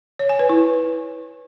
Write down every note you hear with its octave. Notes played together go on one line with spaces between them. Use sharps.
C#5
G#5
B4
E4